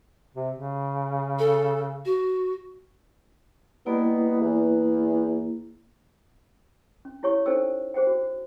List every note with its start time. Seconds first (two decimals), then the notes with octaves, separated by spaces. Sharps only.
0.34 C3
0.55 C#3
1.39 A4
2.05 F#4
3.86 G3 G#3 A#3 B3 E4
4.40 E2
7.05 C#4
7.23 E4 G4 C#5 G#5 C#6
7.46 C#4 D#4 A4 C5 G5 E6
7.94 G#4 C5 F#5 G5
8.07 F#4